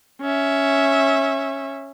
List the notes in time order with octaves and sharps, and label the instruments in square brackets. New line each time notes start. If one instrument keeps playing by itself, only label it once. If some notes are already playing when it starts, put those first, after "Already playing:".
[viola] C#4 E5